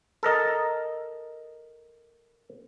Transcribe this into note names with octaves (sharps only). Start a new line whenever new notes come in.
A4 A#4 D#5 A5